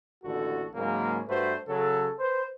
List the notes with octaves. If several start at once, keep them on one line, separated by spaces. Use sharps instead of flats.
A1 D#2 D3 F#4 A4
G#2 C#3 F#3 A#3
G2 A3 F#4 B4 C5
C#3 F#3 A4
B4 C5